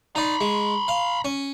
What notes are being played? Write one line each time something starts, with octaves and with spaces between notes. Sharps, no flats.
D#4 D5 A#5 B5
G#3
F5
C#4